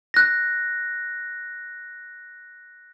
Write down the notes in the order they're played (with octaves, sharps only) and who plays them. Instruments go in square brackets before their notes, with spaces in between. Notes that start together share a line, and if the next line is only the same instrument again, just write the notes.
[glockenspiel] F#6 A#6